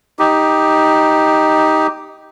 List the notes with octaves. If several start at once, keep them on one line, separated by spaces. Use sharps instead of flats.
D#4 G4